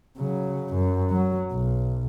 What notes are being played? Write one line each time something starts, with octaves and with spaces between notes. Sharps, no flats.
C#3 F#3
F#2
F#3
B1